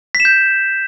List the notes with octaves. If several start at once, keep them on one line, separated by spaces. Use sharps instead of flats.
B6
E7
G6